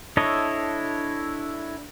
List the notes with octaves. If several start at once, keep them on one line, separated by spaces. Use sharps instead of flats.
D4 E4 A4 C#5 D#5